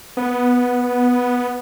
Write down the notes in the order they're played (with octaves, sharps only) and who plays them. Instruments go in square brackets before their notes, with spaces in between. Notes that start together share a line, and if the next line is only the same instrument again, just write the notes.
[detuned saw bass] B3